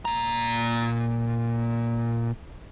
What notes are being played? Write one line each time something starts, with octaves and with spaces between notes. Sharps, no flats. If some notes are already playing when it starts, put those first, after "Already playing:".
A#2 A#5